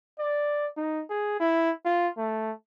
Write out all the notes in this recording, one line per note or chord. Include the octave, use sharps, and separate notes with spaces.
D5
D#4
G#4
E4
F4
A3